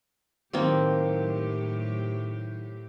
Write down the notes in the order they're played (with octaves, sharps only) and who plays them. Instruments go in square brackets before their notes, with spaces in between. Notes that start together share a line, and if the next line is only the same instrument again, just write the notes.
[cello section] A2 F#3 G4 [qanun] D#3 A#3 C4